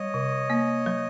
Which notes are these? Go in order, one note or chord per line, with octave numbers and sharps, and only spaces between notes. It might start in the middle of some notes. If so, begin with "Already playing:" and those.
Already playing: G3 C#5 D#5
C3
A#3
F#3